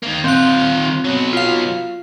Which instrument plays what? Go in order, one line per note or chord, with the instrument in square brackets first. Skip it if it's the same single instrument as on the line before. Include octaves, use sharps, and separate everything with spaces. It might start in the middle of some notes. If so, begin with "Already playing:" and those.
[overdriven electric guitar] D#3 A#3
[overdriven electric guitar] D#3 F4 [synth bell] C4 F#6
[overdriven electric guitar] B2 F#3
[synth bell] F4 F5